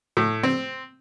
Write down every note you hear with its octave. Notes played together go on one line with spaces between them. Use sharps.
A2
C4